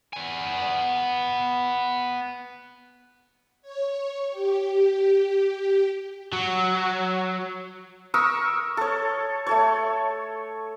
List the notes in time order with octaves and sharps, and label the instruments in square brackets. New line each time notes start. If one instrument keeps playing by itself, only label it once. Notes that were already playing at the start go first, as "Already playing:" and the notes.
[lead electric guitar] B3 G#5
[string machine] C#5
G4
[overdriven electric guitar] F#3
[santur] A#4 C#6 D#6 E6
A4 C#5
A3 A4 C#5